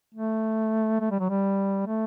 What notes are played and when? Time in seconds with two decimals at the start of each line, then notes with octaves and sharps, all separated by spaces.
0.15 A3
1.01 A3
1.11 G3
1.20 F#3
1.30 G3
1.87 A3